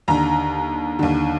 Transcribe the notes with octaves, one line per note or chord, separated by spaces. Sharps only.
D#2 D3 A#5
D#2 D3